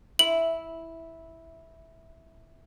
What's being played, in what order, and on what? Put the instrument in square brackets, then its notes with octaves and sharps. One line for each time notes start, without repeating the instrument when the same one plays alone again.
[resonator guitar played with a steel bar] E4 [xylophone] F#7